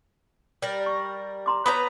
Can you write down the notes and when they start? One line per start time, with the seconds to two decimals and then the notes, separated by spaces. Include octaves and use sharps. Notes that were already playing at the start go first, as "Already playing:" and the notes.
0.62 G3 A#4
0.86 C#6
1.46 A#5 C6 D6
1.66 B3 B4 C#5 A#5 B5